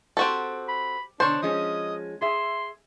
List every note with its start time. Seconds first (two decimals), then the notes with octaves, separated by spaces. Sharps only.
0.17 C4 F#4 G4 A4
0.68 B5
1.20 B2 D3 D4 C5 C#5
1.42 F3 G#3 C#4 D#5
2.21 G#4 E5 C6